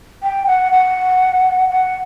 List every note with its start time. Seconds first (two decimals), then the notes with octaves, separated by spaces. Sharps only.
0.23 G5
0.47 F#5
0.72 F#5
1.69 F#5